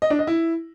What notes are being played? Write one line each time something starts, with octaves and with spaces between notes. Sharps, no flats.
D#5
D4
D#5
E4